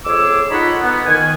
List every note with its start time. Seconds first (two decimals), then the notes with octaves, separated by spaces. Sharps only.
0.05 F2 G#4 C#5 D6 E6
0.51 D#4 F4 A4 C#5 F#5 B5
0.82 B3
1.07 D#3 G#5